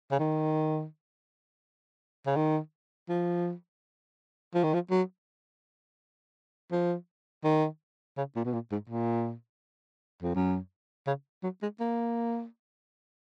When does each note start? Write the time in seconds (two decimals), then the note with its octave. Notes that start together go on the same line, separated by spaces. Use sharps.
0.11 C#3
0.19 D#3
2.27 C#3
2.36 D#3
3.09 F3
4.55 F3
4.64 D#3
4.74 F3
4.91 F#3
6.72 F3
7.44 D#3
8.17 C#3
8.36 A#2
8.45 B2
8.53 A#2
8.72 G#2
8.89 A#2
10.23 F2
10.35 F#2
11.07 C#3
11.43 F#3
11.62 G#3
11.80 A#3